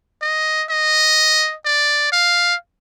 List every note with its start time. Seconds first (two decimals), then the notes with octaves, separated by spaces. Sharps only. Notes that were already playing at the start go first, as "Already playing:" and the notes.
0.22 D#5
0.69 D#5
1.65 D5
2.12 F5